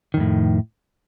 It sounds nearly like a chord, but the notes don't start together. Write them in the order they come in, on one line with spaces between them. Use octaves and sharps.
D#3 F2 A2